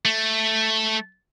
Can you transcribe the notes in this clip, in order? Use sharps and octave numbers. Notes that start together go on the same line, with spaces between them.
A3